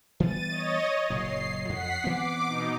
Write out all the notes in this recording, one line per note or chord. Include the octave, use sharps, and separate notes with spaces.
E3 G3 B3 A6 D#7
C#5 D#5
F#1 A#2 F#3 C7
F2 F#5 B6 C7
E3 B3 C4 D6
B2 D#4